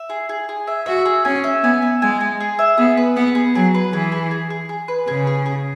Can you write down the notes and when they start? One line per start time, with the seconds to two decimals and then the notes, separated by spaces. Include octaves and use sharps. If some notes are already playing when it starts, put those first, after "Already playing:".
Already playing: E5
0.10 G#4
0.29 G#4
0.49 G#4
0.67 E5
0.86 F#4 E5
1.05 G#4
1.25 C#4 G#5
1.44 E5
1.63 B3 G#5
1.82 E5
2.02 G#3 G#5
2.21 G#5
2.40 G#4
2.59 E5
2.78 B3 G#4
2.97 B4
3.16 B3 F#5
3.35 G#4
3.55 F#3 G#4
3.74 B4
3.93 E3 G#4
4.12 G#4
4.31 G#4
4.50 G#4
4.69 G#4
4.88 B4
5.08 C#3 G#4
5.27 G#4
5.46 G#4